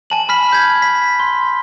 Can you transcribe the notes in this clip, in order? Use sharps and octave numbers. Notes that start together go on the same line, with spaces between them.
G#5 A5 F#7
B5 F6 B6
G6 G#6
B6
C6